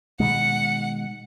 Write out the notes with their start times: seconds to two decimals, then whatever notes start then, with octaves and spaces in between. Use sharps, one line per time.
0.20 B2 D#3 G#3 F#5